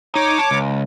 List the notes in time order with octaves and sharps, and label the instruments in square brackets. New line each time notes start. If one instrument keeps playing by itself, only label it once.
[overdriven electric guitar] D#4 [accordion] C#5 D6
[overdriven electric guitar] A5
C#2